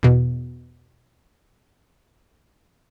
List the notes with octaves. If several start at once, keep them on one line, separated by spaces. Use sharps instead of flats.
E2 B2